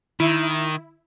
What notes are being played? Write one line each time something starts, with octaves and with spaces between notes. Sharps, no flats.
D#3 E4